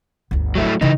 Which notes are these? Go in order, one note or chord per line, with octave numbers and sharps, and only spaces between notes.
G1 D2
F#3 A3 E4
C#3 E3 D#4 E4